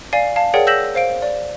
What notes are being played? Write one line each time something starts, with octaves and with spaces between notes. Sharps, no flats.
D5 F5 G#5 C7
F5 A5
G#4 A#4 C#5 D5 F#5 G5
E6 G6 A#6 B6 E7 F#7
C5 F5 D7
D5